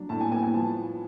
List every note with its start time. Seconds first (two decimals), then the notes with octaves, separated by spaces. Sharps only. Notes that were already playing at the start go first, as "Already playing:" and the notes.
Already playing: F#3 D4
0.09 A2 A5
0.21 G#5
0.32 B3 G#5
0.43 G#5
0.54 F3 A5